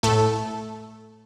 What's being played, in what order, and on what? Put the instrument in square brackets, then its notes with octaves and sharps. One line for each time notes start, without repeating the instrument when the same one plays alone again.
[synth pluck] A2 A3 A4